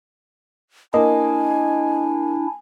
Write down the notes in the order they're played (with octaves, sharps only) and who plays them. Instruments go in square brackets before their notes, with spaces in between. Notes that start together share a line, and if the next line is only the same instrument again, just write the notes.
[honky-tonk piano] A#3 [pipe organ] D4 E4 [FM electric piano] D#5 [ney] G#5